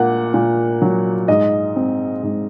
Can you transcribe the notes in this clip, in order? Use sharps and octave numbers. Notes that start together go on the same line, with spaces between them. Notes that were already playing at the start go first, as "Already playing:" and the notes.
Already playing: A#2 A#3 F#5
A#2
F#3
G#2 D#5
C4
G#2